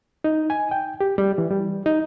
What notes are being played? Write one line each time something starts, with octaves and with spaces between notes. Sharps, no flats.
D#4
G#5
G5
G4
G3
E3
G3
D#4